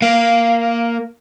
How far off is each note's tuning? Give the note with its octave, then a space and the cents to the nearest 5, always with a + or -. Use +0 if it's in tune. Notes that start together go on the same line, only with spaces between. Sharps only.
A#3 +0 F5 -10